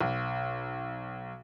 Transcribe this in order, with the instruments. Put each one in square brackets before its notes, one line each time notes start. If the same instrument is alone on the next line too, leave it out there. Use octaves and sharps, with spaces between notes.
[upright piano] B1